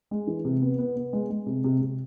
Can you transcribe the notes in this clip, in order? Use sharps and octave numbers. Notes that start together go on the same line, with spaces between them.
G#3
E3
C3
B3
B3
B3
G#3
G#3
C3
C3
C3